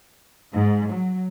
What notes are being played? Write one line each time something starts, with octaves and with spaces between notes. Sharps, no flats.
G#2
F#3